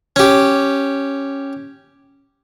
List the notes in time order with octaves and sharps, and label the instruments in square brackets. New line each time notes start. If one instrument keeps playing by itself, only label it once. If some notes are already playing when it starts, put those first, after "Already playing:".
[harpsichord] C#4 G4